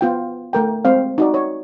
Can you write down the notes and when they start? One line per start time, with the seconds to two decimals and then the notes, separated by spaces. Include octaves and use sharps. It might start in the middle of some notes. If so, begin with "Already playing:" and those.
0.01 B3 F4 G5
0.53 A3 A#4 G5
0.85 G#3 C4 C5 F5
1.18 D#4 F#4 D5
1.34 C#5